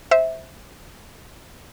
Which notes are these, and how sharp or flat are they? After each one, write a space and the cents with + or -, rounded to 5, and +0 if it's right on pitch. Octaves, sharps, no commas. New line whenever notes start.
C5 +0 E5 -15